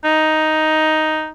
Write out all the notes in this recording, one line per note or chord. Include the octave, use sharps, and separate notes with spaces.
D#4